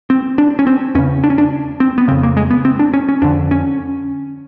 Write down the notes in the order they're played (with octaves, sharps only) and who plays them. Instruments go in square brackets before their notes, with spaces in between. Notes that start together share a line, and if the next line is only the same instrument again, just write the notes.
[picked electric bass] C4
D4
C#4
C4
E2 C#3 C#4
D4
C#4
D4
C4
B3
C#3 C4
F2
A#3
G#3
B3
C4
D4
C#4
C#4
F2 D3 D4
C#4